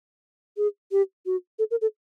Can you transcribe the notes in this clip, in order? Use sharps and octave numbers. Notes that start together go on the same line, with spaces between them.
G#4
G4
F#4
A4
A#4
A4